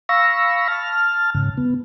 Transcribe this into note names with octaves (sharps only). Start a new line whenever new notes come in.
F5 B5 C#6 E6 A#6
A5 F6
G#2 C#3
B3